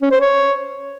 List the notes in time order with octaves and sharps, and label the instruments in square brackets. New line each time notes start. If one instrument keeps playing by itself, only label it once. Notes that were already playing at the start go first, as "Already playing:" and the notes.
[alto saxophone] C#4
C5
C#5